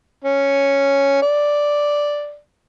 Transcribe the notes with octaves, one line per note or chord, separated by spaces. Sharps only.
C#4
D5